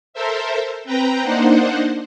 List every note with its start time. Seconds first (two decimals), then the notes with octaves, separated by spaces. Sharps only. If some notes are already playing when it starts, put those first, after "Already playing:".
0.14 A4 A#4 C5 E5
0.84 C4 B4 G5 A#5
1.23 A#3 D4 D#4 C5 F#5